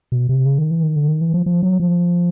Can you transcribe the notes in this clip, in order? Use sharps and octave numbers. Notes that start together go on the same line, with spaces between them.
B2
C3
C#3
D#3
E3
D#3
D3
D#3
E3
F3
F3
F#3
F3